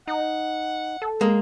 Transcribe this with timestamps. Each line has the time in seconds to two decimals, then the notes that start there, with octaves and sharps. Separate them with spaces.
0.08 D#4 F#5
1.02 A4
1.21 G#3 A#3